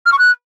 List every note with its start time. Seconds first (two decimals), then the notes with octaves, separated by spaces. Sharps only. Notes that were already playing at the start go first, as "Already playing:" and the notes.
0.06 F6
0.12 C#6
0.19 F#6